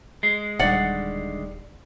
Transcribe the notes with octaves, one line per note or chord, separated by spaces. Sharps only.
G#3
D#1 D3 D#3 G3 D5 F#5